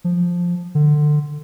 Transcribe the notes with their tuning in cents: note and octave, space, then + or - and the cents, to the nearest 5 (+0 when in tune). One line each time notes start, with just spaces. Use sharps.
F3 +5
D3 +25